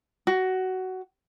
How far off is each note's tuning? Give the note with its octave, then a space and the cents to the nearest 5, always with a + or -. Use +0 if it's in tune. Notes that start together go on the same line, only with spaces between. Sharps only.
F#4 +15